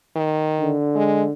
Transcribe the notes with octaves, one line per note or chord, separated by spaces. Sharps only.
D#3
D3
G#3